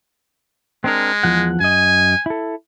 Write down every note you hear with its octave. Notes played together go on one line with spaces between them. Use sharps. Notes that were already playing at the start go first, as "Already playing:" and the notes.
G#3 C4 D4 A#4
E2 F3 F#5
F#2 D#5 G#5
E4 A4